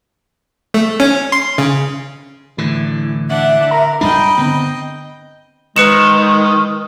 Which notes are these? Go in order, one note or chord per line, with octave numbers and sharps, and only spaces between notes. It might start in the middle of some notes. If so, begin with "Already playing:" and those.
A3
C#4
C6
C#3
A2 D3 E3
D4 E5 F#5
A#4 A#5
G2 G3 D4 D#5 G5 B5
D3 B3 C4
D#3 G#3 B4 C#7 E7